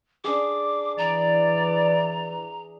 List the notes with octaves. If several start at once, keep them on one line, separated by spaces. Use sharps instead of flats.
D4 G#4 D6
E3 D5 A#5